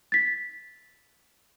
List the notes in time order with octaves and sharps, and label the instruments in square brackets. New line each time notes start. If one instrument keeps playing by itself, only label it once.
[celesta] A6 B6